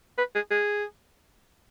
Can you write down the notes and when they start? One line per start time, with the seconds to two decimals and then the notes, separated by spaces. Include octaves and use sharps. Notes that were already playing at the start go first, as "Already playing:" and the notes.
0.18 B4
0.35 G#4
0.51 G#4